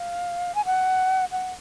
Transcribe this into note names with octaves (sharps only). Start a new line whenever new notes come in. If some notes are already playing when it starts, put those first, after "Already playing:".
Already playing: F5
G#5
F#5
F#5